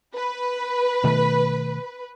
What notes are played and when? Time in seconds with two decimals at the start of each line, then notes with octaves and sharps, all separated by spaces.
0.15 B4
1.04 B2 D#3 A3